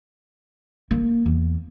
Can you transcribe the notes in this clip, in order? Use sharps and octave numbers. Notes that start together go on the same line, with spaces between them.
A#3
E2